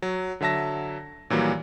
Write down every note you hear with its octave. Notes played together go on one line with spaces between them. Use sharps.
F#3
D3 F#3 E5 A5 A#6
A#2 D#3 E3 F#3 G3 A#3